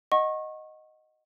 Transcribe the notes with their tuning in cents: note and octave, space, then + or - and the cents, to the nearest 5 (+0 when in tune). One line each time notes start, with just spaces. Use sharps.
D#5 +0 F#5 +0 C#6 -30